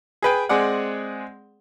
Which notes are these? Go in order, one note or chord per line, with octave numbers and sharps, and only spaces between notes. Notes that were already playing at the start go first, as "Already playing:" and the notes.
G#4 B4 G5
G#3 C4 G#4 D5 F#5